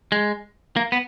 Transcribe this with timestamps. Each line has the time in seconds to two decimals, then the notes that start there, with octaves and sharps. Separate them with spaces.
0.12 G#3
0.76 A#3
0.92 B3